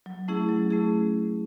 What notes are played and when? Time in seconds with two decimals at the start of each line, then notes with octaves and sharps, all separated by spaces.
0.06 F#3
0.28 A3 C#4 E4 G#4
0.49 F#3
0.71 A3 C#4 E4 G#4